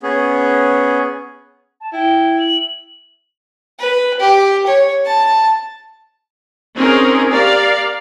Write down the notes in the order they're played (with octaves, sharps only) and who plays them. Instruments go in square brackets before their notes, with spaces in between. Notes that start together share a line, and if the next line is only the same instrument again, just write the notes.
[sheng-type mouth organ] B3 C#4 G#4
[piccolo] A5
[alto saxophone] E4 [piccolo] G5
[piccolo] F#7
[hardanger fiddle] B4
G4
C#5
A5
[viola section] C4 C#4 D#4 G#4 A#4
G4 A#4 D5 F5